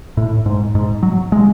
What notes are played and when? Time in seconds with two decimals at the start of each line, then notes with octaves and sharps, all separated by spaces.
0.17 A2
0.46 G#2
0.75 G#2
1.03 F#3
1.32 G#3